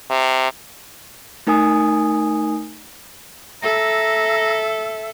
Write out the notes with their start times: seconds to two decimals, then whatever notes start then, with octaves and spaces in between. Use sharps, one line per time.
0.10 C3
1.47 A3 D#4 A#4 G#5 D#6
3.63 A4 E5 A#5